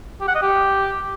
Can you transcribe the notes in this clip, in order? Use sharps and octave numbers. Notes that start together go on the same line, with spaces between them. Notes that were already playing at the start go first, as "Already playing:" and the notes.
G4
F#5
D#5
G4